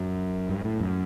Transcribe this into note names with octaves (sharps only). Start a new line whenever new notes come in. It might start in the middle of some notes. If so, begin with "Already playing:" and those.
Already playing: F#2
G2
A2
F#2